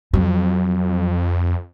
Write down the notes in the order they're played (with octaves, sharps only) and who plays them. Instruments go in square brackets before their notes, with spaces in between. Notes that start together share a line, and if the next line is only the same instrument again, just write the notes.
[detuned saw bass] F2 [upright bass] F#3